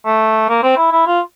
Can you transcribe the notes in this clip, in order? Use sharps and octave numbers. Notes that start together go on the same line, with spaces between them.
A3
A#3
C4
E4
E4
F4